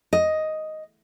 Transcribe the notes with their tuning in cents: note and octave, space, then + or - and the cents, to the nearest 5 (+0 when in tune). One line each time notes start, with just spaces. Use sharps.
D#5 +5